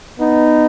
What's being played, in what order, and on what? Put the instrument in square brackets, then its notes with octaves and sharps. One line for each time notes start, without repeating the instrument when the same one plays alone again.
[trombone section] B3 D#4